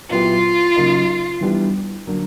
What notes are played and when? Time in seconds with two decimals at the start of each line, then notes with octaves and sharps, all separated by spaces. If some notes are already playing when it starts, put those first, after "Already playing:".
0.10 A#2 F#3 B3 E4 F4 G4
0.76 C#3 F#3 A#3 D#4
1.41 E3 G3 B3 D4 G4
2.07 D3 F#3 A#3 D4